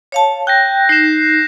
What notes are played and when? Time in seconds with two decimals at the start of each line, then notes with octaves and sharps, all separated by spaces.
0.12 C#5 F5 A5
0.47 G5 F#6 G6 A#6
0.89 D#4 C7 E7